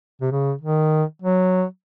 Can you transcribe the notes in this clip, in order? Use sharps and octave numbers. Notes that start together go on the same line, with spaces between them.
C3
C#3
D#3
F#3